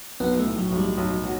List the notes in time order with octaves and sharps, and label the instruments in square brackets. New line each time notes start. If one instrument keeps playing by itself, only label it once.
[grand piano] B1 [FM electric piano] B3
[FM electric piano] A3
[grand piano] A2
[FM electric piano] F#3
[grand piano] B1
[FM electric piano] G3
[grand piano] B1
F#3